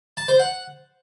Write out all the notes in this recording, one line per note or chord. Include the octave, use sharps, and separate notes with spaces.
A5
C5
F#5